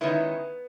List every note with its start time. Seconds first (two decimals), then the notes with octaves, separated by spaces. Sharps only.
0.01 D#3 G#3 B3 C#4 E4